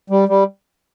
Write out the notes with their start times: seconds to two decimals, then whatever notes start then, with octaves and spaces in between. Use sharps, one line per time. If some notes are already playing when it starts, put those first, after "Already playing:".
0.10 G3
0.28 G3